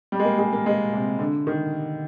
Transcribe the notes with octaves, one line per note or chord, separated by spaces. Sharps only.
G3
G#3
A#3
G#3
A#3
G#3
C3
D3
D#3